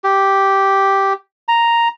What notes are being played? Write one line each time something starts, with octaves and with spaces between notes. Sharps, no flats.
G4
A#5